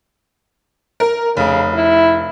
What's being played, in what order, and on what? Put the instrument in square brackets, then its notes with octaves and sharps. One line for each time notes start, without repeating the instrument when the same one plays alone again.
[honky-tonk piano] A#4
[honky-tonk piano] F1 [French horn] C#3
[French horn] E4